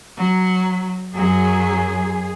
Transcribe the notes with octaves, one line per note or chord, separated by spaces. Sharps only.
F#3
F#2 F#3 G#4